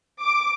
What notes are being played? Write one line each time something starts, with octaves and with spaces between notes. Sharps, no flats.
D6